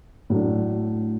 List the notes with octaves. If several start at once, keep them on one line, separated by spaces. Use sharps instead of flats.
A2 F#3 A3 D4